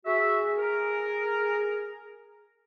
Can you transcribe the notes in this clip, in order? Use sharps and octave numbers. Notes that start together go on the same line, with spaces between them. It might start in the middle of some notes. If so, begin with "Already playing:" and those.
F#4 G#4 E5
A#4